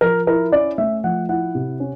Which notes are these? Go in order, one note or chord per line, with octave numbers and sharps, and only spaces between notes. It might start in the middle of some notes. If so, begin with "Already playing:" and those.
F3 A#4
E4 A#4
C#4 D5
A3 E5
F3 F#5
E4 F#5
C3
C#4